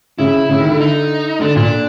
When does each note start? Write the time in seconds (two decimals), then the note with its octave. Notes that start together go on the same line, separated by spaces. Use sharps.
0.19 C#3 E4
0.49 C#3
0.60 D#3
0.70 D3
0.80 D#4
1.41 D3 D4
1.56 A#2 D4